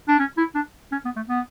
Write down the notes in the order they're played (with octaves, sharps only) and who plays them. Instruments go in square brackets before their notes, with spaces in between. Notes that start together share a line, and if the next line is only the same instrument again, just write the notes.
[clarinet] D4
C#4
E4
D4
C#4
B3
A3
B3